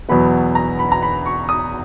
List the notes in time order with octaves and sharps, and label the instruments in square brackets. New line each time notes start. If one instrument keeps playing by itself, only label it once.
[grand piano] E2 B2 F#3 B3 [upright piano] B5
[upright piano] A#5
B5
A#5
B5
C#6
D#6